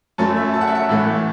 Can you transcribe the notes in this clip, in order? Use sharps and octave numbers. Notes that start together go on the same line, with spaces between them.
F#2 F#3 A3 A5
E5
A5
F#5
E5
F#5
A2 E3 A3